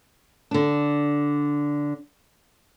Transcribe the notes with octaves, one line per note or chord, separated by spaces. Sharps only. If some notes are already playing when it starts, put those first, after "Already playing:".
D3 D4